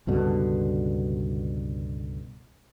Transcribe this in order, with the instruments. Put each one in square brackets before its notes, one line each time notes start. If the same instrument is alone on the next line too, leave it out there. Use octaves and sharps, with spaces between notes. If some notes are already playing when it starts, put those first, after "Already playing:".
[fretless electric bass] C#2 G2 B2 D3